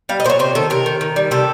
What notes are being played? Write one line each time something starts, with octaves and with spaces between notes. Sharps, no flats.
G3 F5
D#5
A#2 C5
C#5
C3 C5
D#3 A4
C3 A#4
D#3
D#3
G3
C3 A4